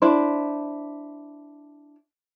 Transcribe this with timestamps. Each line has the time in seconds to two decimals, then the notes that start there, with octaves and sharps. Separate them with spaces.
0.02 D4 E4 C5